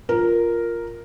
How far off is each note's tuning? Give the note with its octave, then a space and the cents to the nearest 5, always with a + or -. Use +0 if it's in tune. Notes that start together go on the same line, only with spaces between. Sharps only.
F4 +0 A#4 +0